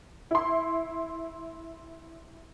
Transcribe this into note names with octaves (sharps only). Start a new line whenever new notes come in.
E4 C6